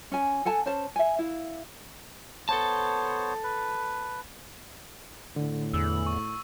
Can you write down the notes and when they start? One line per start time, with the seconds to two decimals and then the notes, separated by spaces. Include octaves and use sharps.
0.12 C#4 G#5
0.45 A4 F#5 G#5 A5
0.66 C#4 C5 A5
0.96 E5 G#5
1.19 E4 F5
2.49 B3 A4 C5 C#5 A5
3.43 B4
5.36 A2 D3
5.74 E2 E6
6.07 C#6